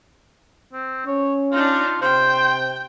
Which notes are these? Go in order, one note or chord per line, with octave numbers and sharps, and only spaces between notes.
C4
C#4 C#5
D4 D#4 F4
C3 C5 G5